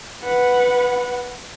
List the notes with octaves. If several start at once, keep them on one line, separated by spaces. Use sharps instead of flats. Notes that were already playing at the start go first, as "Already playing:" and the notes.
B4 F#5